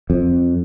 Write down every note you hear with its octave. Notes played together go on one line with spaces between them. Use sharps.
F2